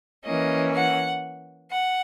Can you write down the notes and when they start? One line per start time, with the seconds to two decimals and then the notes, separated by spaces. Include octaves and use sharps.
0.25 E3 A#3 C#4 D#5
0.74 F#5
1.71 F#5